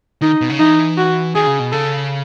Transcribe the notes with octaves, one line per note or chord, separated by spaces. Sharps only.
D#3 D#4
B2
C#3
E3 D#4
F#4
D#3 G#4
C#3
B2
C#3 A4